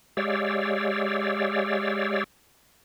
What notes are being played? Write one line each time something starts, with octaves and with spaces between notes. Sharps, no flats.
G#3 G4 C#5 D5 F5 E6